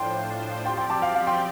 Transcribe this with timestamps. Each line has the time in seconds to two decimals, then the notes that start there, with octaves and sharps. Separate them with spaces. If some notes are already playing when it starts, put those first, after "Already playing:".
Already playing: A2 F3 D4 F4 C5 G5 C6
0.65 F3 C4 G4 D5 G5 C6
0.77 G5 C6
0.90 A5 D6
1.02 F5
1.15 F5
1.27 G5 C6